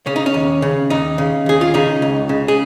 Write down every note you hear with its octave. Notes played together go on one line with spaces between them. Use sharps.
C#3 C#4
D#4
C#4
D#2
C#3
D#2 D#4
C#3
D#2 G#4
F4
C#3 D#4
C#2
C#3
G#4